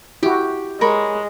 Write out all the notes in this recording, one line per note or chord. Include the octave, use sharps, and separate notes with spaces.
E4 F#4 G4
G#3 A#4 C#5 B5